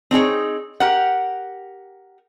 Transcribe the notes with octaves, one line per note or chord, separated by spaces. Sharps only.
C4 D#4 G#4 C#5
G4 A#4 F#5